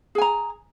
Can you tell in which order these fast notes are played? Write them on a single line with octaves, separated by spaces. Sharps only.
G#4 G#5 A#5